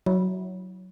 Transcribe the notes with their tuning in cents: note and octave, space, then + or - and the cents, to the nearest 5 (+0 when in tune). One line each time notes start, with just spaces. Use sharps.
F#3 +0 E4 -20